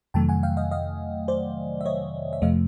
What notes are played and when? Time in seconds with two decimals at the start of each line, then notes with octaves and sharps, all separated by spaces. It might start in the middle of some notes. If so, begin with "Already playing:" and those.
0.14 F2 C3 D#3 F#3 A3 G5 A5
0.29 F#5 G#5
0.43 F5 G5
0.57 D#5 F5
0.71 D#5 F5
1.28 C5 D5
1.81 E5
1.85 C#5 D#5
2.33 E5
2.42 F2 C3 F3 A3 D#5 F5